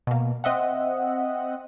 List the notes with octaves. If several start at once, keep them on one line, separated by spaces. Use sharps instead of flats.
B2 A#3
C4 D#5 E5 F#5